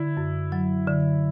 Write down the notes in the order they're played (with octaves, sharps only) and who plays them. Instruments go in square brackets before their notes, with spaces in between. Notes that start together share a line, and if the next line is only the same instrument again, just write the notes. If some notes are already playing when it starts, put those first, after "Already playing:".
Already playing: [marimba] D3 [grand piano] E4
[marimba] F#2
F#3
D3